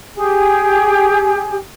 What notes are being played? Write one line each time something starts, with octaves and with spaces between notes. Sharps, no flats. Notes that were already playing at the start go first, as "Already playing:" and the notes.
G4 G#4 G#5